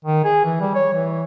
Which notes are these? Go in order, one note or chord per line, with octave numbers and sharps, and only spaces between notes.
D#3
G#4
E3
G3
C#5
E3